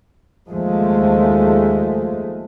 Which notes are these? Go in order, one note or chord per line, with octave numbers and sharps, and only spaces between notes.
D#2 F3 G#3 A3